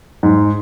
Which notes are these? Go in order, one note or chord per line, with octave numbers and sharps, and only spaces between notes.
G#2